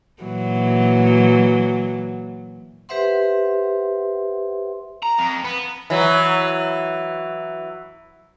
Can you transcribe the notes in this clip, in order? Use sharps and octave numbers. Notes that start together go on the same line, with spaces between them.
A#2 E3 F#3
G4 B4 C5 E5 F#5 C6
A#5
F2
B3
E3 F#3